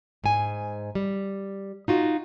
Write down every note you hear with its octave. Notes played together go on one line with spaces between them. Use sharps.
G#2 G#5
G3
D#4 F4 F#4